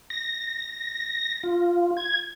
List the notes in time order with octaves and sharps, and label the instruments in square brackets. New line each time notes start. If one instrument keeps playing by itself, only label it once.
[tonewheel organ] A#6
F4
G#6